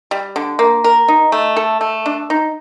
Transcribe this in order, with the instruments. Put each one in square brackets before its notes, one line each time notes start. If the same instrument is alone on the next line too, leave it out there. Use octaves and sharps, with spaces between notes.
[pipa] G3
D3
A#3
A#4
D#4
A3
A4
A3
D4
D#4